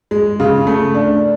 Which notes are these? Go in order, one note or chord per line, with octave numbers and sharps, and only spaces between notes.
G#3
C#3
A3
D4